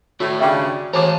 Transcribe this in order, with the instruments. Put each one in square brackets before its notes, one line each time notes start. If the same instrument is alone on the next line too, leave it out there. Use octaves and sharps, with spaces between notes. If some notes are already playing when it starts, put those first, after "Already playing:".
[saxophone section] A2 [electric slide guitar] F#4 D5
[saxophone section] G2 C#3 [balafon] E5 G5 D6
[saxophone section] A2 G#3 [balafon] E3 C#5 D6 [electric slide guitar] F5 A5 A#5